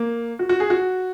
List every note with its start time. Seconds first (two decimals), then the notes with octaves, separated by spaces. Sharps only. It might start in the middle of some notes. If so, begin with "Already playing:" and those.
Already playing: A#3
0.39 F#4
0.49 F#4
0.60 G#4
0.70 F#4